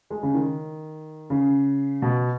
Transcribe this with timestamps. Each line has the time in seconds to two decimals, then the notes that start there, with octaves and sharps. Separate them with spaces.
0.10 G#3
0.23 C#3
0.34 D#3
1.30 C#3
2.02 B2